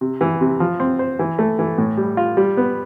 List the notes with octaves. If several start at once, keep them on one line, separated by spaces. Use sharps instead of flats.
C3
E3
C3
F3
C4
C5
E3
A3
E3
A2
G3
F4
G3
B3